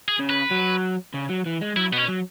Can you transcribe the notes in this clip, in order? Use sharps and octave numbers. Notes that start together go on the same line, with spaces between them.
G#4
C#3
B4
F#3
C#3
F#3
E3
G#3
F#3 E4
B2 B3
C#4
F#3